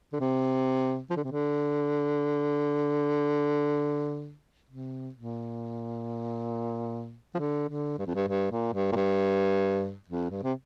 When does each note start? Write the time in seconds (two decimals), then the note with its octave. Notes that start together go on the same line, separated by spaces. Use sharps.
0.13 D3
0.20 C3
1.10 F3
1.16 D3
1.24 C3
1.31 D3
4.69 C3
5.14 A#2
7.35 F3
7.39 D3
7.69 D3
7.98 G2
8.06 F2
8.15 G2
8.28 G2
8.51 A#2
8.73 G2
8.92 A#2
8.96 G2
10.08 F2
10.30 G2
10.43 C3